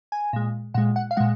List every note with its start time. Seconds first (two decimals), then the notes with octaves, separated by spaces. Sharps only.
0.12 G#5
0.33 A#2 G#3
0.74 A#2 G#3 F#5
0.96 F#5
1.11 F5
1.17 A#2 G#3 F#5